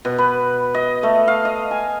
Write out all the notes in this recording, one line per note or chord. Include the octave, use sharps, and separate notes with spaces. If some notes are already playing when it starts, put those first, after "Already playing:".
B2
B4
D#5
A3
F5
D#5
G#5